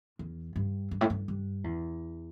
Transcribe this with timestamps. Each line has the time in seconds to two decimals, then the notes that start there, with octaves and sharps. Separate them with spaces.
0.19 E2
0.56 G2
0.91 G2
1.01 A2
1.10 G2
1.28 G2
1.64 E2